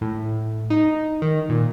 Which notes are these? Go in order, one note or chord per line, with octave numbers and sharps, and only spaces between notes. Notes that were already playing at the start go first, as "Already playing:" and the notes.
A2
D#4
D#3
A#2